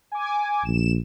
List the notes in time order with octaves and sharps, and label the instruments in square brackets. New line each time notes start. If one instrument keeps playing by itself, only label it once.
[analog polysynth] G#5 D6
[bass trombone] A#1 [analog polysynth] E7